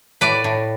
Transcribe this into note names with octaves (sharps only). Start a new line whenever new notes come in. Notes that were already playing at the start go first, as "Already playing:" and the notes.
A2 B4 D5
A2